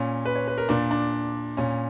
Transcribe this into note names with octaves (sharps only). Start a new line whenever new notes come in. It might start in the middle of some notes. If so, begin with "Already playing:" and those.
Already playing: A#2 C#4
B4
C#5
B4
A#4
A#2 D4
D4
A#2 C#4